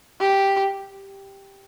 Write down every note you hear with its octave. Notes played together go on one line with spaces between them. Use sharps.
G4